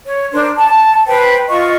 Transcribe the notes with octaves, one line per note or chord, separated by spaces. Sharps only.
C#5
D4 A#4 C5
A5
B4 C5 G5 B5
F4 D#5 C#6